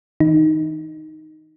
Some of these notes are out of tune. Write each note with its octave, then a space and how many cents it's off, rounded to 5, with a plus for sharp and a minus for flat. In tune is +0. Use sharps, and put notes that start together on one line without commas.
E3 -45 D#4 +0